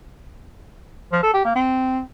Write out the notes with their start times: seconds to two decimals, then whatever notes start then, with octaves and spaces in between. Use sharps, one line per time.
1.12 F3
1.23 A4
1.34 G4
1.45 A#3
1.55 C4